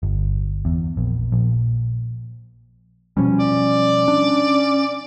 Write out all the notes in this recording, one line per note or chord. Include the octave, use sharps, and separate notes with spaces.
G1
E2
A#1
A#1
B2 F3 G3 C#4
D5
D4